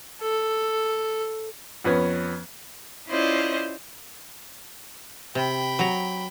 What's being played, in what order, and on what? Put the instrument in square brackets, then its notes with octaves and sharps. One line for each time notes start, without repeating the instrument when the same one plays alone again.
[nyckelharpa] A4
[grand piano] F2 B3 C#4 B4 G#6
[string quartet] C#4 E4 F4 C5 D5 D#5
[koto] C3 [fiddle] G5 B5
[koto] F#3 A#5